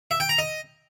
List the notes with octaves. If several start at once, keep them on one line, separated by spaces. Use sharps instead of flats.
E5
G5
A#5
D#5